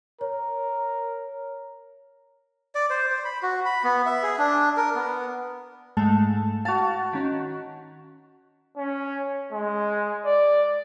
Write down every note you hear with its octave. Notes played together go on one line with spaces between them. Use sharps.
A#4 C#5
D5
C5
C5
B5
F#4
B5
B3
E5
G#4
D4
A#4
B3
G#2 G#3 A3 A5
F#4 F5 A5 A6
D#3 C#4
C#4
G#3
D5